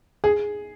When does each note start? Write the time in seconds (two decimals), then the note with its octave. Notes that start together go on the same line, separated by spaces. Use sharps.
0.24 G#4